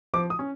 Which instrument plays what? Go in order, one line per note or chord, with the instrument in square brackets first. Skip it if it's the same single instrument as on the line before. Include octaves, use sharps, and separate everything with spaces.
[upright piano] F3 [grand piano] D6
[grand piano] D#6
[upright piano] C#4